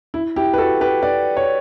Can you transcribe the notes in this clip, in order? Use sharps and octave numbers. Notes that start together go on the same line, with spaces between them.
E4
E4 G4
B4
F#4 A4
G4 B4
B4 D5
C#5